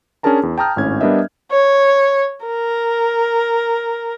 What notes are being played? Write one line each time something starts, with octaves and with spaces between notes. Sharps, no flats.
C#4 D4 G#4 A#4 A5 A#5
E2
G5 A5 A#5 D#6 F6 G6
G#1 A2 C#4 G#6
G3 B3 D4 A#4 D#5 E5
C#5
A#4